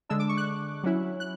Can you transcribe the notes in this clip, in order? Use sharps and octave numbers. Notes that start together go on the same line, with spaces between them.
D3 G#3 D4 E6
D6
C#6
F#6
F#3 C#4 E4
F#6